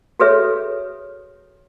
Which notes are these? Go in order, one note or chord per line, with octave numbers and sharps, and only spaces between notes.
F#4 G#4 A4 B4 C#5 E5